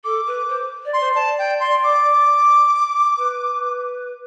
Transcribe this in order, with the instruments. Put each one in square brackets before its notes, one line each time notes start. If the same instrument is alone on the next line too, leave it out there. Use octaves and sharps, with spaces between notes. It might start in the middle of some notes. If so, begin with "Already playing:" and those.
[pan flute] A4 [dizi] D6
[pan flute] B4
C5
D5
[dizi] C6
[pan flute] C5
[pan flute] D5 [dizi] A5
[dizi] G5
C6
D6
[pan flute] B4